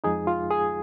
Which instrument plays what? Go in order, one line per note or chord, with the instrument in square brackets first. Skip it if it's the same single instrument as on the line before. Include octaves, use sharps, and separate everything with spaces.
[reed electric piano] F2 F3 G#3 D#4 G#4
F4
G#4